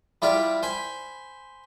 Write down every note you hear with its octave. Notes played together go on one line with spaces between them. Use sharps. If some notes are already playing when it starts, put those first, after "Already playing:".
G3 E4 F4 G4 D5 B5
C5 G#5 B5